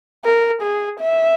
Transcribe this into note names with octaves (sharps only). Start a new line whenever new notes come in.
A#4
G#4
E5